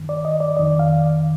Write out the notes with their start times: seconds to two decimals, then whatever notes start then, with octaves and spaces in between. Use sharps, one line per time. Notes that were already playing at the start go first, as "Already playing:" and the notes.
Already playing: G2 D#3
0.09 D5
0.25 D#5
0.40 D5
0.56 F2 D#3 D5
0.79 F5